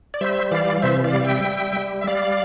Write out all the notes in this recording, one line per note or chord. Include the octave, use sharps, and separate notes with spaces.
D5
G3 C5 E5
E3 D5 F5
F5
C3 C5 E5
D5 F5
G3
F5
E5 G5
G3
G3
E5
G3 D5 F5